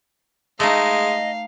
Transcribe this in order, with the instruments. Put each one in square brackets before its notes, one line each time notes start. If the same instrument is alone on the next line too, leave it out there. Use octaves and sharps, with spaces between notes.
[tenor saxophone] G#3 [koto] A3 D#4 [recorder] D#5 [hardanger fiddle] F5